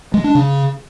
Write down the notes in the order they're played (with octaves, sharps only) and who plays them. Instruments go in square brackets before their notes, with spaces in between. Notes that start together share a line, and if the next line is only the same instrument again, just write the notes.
[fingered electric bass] G#3
D4
C#3